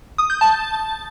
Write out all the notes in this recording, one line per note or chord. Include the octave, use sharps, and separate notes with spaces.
D#6
G6
A5